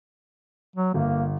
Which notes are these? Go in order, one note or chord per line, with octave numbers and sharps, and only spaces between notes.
F#3
G1 A#3